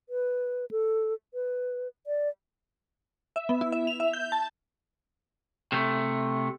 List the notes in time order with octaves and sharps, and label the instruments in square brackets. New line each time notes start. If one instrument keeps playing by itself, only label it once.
[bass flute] B4
A4
B4
D5
[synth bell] E5
B3
E4
E5
F7
E5
G6
A5
[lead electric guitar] C3 A3